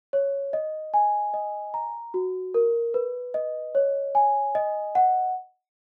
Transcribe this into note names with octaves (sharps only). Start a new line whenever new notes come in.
C#5
D#5
G#5
D#5
A#5
F#4
A#4
B4
D#5
C#5
G#5
D#5
F#5